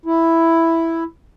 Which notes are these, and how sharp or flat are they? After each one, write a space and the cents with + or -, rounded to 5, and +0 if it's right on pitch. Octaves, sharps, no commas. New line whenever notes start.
E4 +0